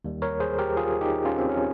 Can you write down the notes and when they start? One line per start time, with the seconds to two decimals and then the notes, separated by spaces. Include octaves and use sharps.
0.04 D#2 D#3 G3
0.22 A#4 C#5
0.40 G#4 C5
0.58 G4 A#4
0.77 F4 G#4
1.01 D#4 G4
1.25 C#4 F4
1.38 C4
1.49 C#4